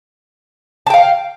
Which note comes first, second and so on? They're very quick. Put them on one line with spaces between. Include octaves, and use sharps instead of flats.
A5 G5 F5